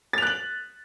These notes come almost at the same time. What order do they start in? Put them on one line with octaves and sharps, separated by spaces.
A6 F7 F#6 F#7